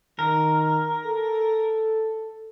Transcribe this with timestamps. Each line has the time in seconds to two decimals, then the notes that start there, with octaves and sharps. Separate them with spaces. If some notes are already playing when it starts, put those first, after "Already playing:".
0.19 D#3 A#4
1.06 A4